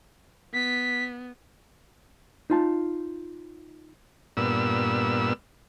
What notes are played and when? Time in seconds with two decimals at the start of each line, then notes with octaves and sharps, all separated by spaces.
0.53 B3 B6
2.50 D#4 F4 A5
4.37 G2 A#2 B3 E6